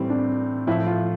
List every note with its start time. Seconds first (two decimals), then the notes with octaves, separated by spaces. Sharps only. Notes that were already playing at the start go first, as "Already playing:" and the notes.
Already playing: A2 E3 G3 C4
0.10 D4
0.67 A2 F3 E4
0.87 F4